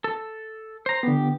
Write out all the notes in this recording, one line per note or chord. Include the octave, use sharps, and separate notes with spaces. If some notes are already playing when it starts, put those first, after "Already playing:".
A4
C5 A#5
D3 B3 G4